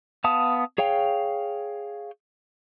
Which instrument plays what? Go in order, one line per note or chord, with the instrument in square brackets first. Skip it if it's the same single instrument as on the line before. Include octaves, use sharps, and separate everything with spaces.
[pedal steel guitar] B3 F5 A5 D#6
G#4 C#5 F5 G5